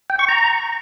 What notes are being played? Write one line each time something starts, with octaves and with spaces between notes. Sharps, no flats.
G5
C#6
A#5